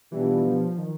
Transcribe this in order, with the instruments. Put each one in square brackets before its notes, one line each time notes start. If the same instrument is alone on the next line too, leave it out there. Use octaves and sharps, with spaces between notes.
[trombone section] B2 G3 B3 D4 F4 [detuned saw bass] E3
[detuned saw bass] F3
D#3